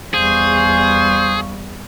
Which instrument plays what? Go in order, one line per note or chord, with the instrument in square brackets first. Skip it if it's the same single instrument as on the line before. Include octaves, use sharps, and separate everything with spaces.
[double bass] E2 G3 [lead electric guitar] G#4 [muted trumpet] C5 [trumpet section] F5 C#6